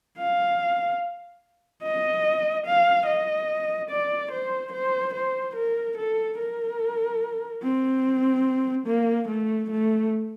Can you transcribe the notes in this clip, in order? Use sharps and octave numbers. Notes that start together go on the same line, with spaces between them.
F5
D#5
F5
D#5
D5
C5
C5
C5
A#4
A4
A#4
C4
A#3
A3
A3